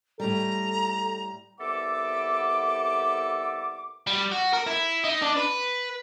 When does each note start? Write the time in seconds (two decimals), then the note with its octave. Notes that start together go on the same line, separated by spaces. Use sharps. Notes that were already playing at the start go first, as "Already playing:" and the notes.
0.20 A2 G3 A4 A#5
1.59 C2 B3 A4 E5 D6
4.07 G3
4.32 F#4
4.53 A#4
4.67 E4
5.04 D#4
5.22 D4
5.36 B4